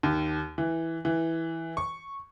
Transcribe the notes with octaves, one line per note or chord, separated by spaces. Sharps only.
D#2
E3
E3
C#6